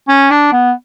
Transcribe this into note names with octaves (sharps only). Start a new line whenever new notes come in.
C#4
D4
B3